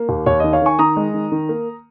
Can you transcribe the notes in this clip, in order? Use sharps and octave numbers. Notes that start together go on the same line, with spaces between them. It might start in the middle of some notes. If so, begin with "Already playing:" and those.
Already playing: A#3
D#2
D#2 C#5
D#3 D#5
C#5 F5
D#3 G#5 C#6
D#3 A#5 D#6
G#3
D#3
D#3
A#3